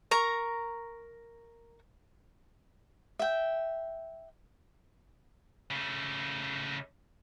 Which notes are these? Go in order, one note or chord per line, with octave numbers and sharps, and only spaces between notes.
A#4 A#5 C#6
E5 G5
C#3 A3